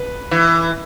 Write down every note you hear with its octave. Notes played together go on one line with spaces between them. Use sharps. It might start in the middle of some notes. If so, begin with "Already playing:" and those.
Already playing: B4
E3